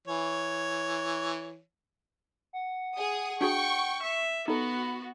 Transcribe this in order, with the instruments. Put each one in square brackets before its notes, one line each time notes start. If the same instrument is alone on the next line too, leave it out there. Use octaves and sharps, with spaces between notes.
[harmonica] E3 C#5
[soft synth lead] F#5
[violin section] G#4 D#6
[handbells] D4 F#4 G#4 [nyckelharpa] G5 [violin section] C#6
[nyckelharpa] E5
[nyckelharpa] B3 [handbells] D#4 A4 [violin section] F#4 [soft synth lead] B5